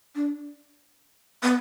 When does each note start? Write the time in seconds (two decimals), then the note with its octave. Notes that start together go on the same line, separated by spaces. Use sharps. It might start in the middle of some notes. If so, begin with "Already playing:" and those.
0.15 D4
1.43 B3